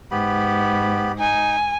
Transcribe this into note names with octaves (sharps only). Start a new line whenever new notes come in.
G#2 B3 G4 B5
D#4 G#5